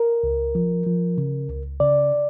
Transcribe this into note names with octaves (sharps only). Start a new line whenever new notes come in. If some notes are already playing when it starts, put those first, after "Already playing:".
Already playing: A#4
C#2
F3
F3
C#3
C#2
C#3 D5